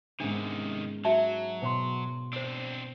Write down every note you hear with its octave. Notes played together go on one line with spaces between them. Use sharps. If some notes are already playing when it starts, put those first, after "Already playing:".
G#2 C3 D#3 B3 C#4 D4
F#3 F#4 E5 A5
B2 C#5 C6
C4 D4 C5 E6